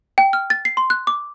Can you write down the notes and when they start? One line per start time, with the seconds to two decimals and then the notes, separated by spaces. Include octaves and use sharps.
0.18 G5
0.33 F6
0.50 A6
0.65 C7
0.77 C6
0.90 F#6
1.07 D6